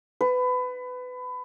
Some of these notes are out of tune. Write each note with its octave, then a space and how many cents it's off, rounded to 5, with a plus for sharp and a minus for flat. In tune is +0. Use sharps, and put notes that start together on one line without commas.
B4 +25